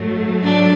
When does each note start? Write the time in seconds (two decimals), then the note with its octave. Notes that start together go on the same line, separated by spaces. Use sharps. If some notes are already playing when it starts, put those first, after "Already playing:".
Already playing: G#2 F#3 A3
0.42 D4